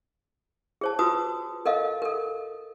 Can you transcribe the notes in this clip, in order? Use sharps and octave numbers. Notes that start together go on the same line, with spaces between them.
G#4 C5 A5
F4 F#4 B4 A5 D#6
A4 A#4 D#5 F5
A4 A#4